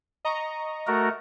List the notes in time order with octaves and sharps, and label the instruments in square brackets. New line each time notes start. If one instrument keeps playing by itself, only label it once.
[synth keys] D#5 A#5 C#6
[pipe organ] A3 F#4 A#4